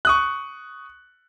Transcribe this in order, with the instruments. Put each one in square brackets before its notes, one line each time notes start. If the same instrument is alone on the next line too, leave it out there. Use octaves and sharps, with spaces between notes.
[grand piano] C#6 D#6 F#6